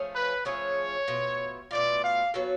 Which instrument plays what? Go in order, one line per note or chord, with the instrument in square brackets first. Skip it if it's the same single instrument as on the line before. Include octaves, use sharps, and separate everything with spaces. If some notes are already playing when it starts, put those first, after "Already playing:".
Already playing: [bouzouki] F3 A3 C#4 G#4
[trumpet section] B4
[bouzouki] F3 A3 C#4 G#4 [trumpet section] C#5
[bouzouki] B2 A3 F4
[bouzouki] B2 A3 F4 [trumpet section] D5
[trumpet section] F5
[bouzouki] F#3 B3 F#4 A4